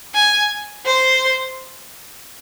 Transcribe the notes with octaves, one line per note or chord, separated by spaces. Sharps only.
G#5
C5